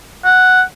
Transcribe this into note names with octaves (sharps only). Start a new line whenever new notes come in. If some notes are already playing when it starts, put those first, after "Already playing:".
F#5